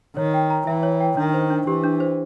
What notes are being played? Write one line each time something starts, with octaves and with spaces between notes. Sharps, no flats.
D#3 C#5
G5
A#5
E3 E5
C#5
G5
D#3 D4
C5
D4
E3 G4
D4
C5